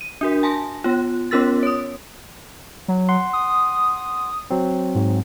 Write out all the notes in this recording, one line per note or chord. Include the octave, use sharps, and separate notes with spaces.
D#7
D4 F#4 A#4
G#5 A5 C6 A#6
B3 F4
B3 C#4 F4 A#4 E6 A6
C#5 D#6
F#3
F#5 C6
D#6
F#3 C4
G#2